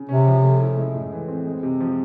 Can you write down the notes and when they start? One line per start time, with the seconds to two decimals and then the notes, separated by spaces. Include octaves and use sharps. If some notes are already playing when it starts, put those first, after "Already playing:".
Already playing: C#3
0.09 C3 C#4
0.27 F3
0.43 A3
0.60 E4
0.77 G#3
0.95 A2
1.12 E3
1.28 C4
1.46 G#3
1.63 C3
1.80 F3